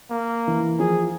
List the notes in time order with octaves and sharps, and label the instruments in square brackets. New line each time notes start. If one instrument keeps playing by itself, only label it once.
[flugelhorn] A#3
[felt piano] E3
[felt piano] F3 [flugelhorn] G#4